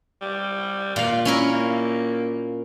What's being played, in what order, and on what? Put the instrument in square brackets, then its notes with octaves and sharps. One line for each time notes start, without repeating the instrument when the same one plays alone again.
[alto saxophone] G3
[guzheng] A#2 F5 [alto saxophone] F4
[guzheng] C#4 E4 A#4
[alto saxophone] A#3